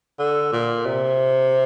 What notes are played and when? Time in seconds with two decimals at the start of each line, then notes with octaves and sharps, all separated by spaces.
0.19 D3
0.52 A#2
0.86 C3